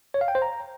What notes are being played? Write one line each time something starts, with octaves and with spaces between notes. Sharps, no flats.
C#5
F5
G5
C5
A#5